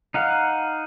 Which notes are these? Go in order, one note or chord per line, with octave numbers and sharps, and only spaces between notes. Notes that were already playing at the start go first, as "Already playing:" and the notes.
D#4 F5 F#5